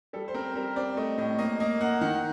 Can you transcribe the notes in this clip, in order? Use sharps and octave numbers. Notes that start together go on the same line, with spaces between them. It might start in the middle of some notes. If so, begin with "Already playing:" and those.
G3 A4
C5
C4 A#4
G3 A#4
C4 D5
A3 D#5
A2 D#5
A#3 D#5
A#3 D#5
A#3 F#5
D#3 F#5